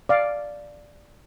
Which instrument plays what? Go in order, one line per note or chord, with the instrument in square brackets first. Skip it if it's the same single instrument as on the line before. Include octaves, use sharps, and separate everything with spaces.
[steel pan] D5 F5